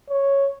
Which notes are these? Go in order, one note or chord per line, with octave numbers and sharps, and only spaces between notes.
C#5